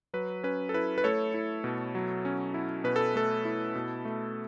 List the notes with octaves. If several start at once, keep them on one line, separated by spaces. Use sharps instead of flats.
F#3 B4
C#4 B4
A4
E4 B4
B4
A3 A4 C#5
E4
B2
F#3
C#4
E4
B2 B4
A4
A3 A4
E4
B2
A3